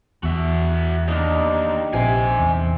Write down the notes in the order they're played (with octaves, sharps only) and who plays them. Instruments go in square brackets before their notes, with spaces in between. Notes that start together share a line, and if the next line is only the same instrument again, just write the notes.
[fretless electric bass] E2 [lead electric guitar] F#4 E5
[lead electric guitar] D#2 [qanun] D4 D#4
[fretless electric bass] A#1 [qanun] C3 [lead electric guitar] C5 G#5
[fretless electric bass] E2